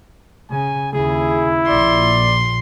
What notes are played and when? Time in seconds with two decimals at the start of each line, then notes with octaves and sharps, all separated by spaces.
0.51 C#3 G#5
0.93 D#2 C#3 E4 G#4
1.68 A#1 A#2 D5 C6